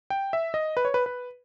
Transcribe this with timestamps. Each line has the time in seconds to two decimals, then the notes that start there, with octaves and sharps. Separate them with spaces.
0.10 G5
0.33 E5
0.54 D#5
0.77 B4
0.85 C#5
0.94 B4
1.06 B4